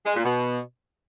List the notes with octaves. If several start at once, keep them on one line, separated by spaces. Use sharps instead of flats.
G#3
A#2
B2